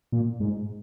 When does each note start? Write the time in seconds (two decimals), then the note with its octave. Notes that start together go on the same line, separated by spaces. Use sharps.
0.12 A#2
0.40 G#2